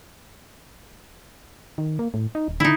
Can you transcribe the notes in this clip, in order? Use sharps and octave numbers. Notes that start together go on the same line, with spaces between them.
D#3
A#3
A2
D#4
D#1
D3 D#4 E4